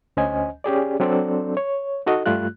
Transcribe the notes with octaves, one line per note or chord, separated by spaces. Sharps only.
D2 C#4 C5 D#5 G#5
C#4 G4 G#4 D5
F#3 C4 D4 A4 C5 D5
C#5
D#4 F#4 A4 D#5
G2 G3 A3 F4 F#6